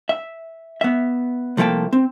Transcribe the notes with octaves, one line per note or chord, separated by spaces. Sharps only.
E5
B3 E5
C2 F3 A3 A#3 G5 A5
C4